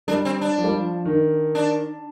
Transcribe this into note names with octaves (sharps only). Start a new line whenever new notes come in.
G3 D4
C4
D4
F3
G3
F3
D#3
D4